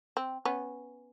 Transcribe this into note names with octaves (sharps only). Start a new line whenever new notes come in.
C4
B3 C#4